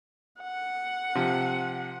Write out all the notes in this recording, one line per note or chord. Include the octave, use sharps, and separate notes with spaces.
F#5
C3 F3